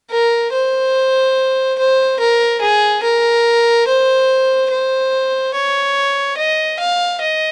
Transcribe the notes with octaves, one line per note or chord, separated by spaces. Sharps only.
A#4
C5
C5
A#4
G#4
A#4
C5
C5
C#5
D#5
F5
D#5